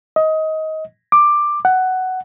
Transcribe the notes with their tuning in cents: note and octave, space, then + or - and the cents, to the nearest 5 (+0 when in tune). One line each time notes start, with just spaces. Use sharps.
D#5 +20
D6 +10
F#5 +10